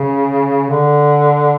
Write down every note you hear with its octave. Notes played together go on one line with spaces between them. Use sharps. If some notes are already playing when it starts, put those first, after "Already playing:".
Already playing: C#3
D3